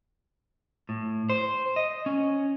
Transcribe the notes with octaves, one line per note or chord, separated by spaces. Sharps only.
A2
C5
D#5
C#4